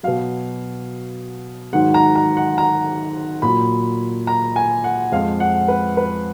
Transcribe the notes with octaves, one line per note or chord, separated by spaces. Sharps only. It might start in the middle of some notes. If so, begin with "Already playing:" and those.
B2 F#3 F5
G#2 D#3 F#3 F#5
A#5
A#5
F#5
A#5
A#2 F#3 B5
A#5
G#5
F#5
F2 F3 G#3 F5
F#5
B4
B4